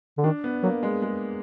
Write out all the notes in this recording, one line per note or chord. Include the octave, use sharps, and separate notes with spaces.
D3
D#3 D4
B3
F#3 A#3
G#3
G#3